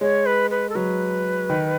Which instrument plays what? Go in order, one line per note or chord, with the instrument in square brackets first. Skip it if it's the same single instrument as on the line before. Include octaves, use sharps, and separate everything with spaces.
[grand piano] G#3 [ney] C#5
[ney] B4
B4
A4
[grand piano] F#3 [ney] B4
[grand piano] D#3